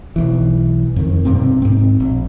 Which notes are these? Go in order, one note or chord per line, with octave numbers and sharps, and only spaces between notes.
B1 E3
F2 D#3
B1 G2 C3 C4
G#2 C4
A#1